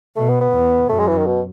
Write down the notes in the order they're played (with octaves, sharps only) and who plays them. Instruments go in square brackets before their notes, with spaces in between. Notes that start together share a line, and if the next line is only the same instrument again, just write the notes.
[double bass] B2 [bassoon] A3
[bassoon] B3
B3
[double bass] E2
[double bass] F#2 [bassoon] A3
[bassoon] G#3
E3
D#3
B2